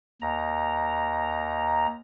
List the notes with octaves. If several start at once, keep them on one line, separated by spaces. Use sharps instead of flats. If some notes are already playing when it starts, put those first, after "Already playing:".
D#2 A#5